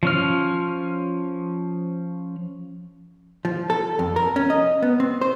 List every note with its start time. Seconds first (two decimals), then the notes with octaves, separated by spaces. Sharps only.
0.03 F3 C#4 F6
3.45 F3
3.70 A4
3.99 F2
4.16 A#4
4.36 C#4
4.50 D#5
4.82 B3
5.00 C4
5.21 C5